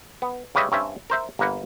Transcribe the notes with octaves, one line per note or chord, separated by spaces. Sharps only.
B3
C#3 G3 C#4 B4 D#5 E5
G2 C4 C#4 E5
A#4 C5 E5
G1 A#3 A#4 B4 F#5